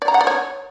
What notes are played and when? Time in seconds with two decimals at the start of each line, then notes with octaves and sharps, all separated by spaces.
0.02 D5
0.08 A#5
0.14 F#5
0.21 D5
0.27 C#5